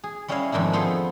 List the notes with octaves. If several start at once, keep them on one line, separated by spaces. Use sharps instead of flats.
G#4
G3 C#4 E4 G#4 D#5 F5
F2 G#2 D#3 D4 E4
B3 F4 G#4 A4 C5